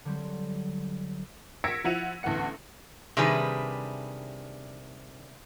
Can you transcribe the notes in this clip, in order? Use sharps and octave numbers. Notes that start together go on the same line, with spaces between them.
D3 F#3 G3 C4
E6 G#6 A#6 B6 C#7 D7
F3 E4 F#5 D#7 F7
A1 D2 E3 B3 F#5 C#7
C3 D#3 G3 D4 G#4 B4